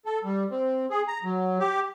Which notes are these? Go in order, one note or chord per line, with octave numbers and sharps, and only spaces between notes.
A4
G3
C4
G#4
A#5
F#3
G4